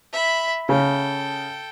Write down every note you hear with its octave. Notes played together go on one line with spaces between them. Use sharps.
E5 B5
C#3 A4 G5